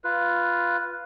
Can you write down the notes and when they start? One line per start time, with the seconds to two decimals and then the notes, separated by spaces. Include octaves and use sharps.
0.04 F4 B4